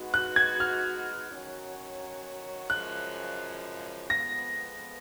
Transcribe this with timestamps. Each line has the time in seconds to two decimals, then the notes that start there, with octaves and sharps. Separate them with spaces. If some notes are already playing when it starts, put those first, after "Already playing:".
Already playing: G#3 B3 D#4 F#4 B4
0.14 F#6
0.36 G#6
0.60 F6
1.31 D#3 F#3 C#4 F#4 C#5
2.70 F#2 C#3 F3 G#3 F#6
4.10 F2 F3 G#3 B3 A#6